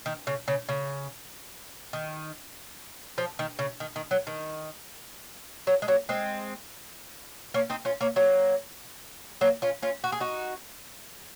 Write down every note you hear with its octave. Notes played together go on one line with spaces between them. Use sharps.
D#3
C#3
C#3
C#3
D#3
F3
D#3
C#3
D#3
D#3
F#3
D#3
F#3
G#3
F#3 A#3
G#3 C4
A#3 C#4
C4 D#4
C#4 F4
A#3 C#4
F#3 A#3
F#3 A#3
C#4 F4
C#4 F4
F#4
G#4
D#4 F#4